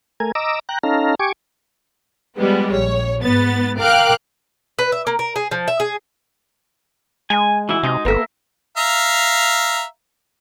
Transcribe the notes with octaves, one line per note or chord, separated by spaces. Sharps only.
A3 A#4 G#5
D#5 A#5 D6 E6
G5 A#5 F#6
C#4 D#4 A4 F5 A#5
G4 G#5 C#6 D6
F3 G3 G#3 B3
A#1 C#5
G#2 B3 A6
A#4 F5 G5 D6 F6 F#6
B4
E5
A#3
A#4
G#4
F3
E5
G#4
G#3 G#5
E3 E4 F#4
C3 G#3 D#4
G1 A#3 B3 A4 A#4 E5
E5 F5 A#5